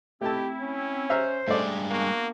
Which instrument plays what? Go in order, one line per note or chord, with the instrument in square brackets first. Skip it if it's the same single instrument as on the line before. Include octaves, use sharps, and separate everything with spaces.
[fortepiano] A3 A5 [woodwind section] C4 E4 [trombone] G4
[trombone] C#4
[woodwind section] C5 [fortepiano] E5 A#5 F6
[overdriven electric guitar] G2 G#3 [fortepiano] A3 D5
[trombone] A#3 [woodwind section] B3 D4 F#4